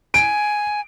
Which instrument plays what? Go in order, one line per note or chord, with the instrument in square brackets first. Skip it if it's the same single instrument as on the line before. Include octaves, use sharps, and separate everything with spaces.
[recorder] G#5 [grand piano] D7